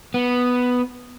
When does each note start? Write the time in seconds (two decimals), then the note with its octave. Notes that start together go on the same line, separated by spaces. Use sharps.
0.14 B3